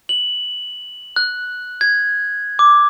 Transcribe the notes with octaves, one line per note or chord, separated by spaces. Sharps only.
F#7
F#6
G#6
D6